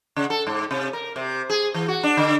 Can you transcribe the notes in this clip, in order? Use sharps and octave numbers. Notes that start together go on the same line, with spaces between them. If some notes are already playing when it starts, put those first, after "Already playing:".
C#3
A4
G#2
C3
A#4
C3
G#4
E3
F#4
D4
D3